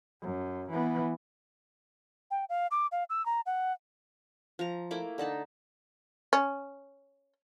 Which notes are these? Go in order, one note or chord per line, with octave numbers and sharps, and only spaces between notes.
F#2
E3 B3
G5
F5
D6
F5
E6
A#5
F#5
F3 A#5
A3 A#3 E4 D6
D3 D#4 A5 B5
C#4